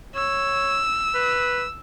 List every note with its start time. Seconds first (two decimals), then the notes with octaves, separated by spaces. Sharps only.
0.15 C#5 E6
1.15 B4